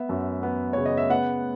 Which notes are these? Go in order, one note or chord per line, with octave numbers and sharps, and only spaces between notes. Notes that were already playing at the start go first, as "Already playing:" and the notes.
Already playing: B3 E5
F#2
B3
C#3 C#5
D#5
E5
B3 F#5